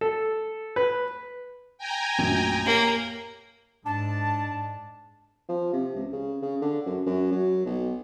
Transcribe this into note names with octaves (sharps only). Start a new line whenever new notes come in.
A4
B4
G5 G#5 A#5
A#1 F#2 A2
A#3 G4 C#5
G#2 D4 A5
F3
C3
C#2
C#3
C#3
D3
F#2
F#2
F#3
B1